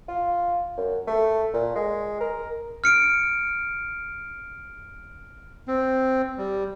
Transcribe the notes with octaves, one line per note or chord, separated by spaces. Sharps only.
F4
F#2
A3
A#2
G#3
A#4
F6 C#7 D7
C4
G3